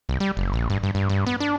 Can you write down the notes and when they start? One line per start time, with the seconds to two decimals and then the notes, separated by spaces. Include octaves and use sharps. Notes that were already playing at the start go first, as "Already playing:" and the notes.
0.09 C2
0.20 G3
0.37 F#1
0.53 A#1
0.70 G2
0.83 G2
0.95 G2
1.09 G2
1.27 B3
1.40 D4